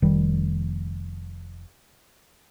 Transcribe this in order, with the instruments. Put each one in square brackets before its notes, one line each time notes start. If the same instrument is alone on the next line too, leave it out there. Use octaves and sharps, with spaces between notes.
[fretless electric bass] F1 D#3 G3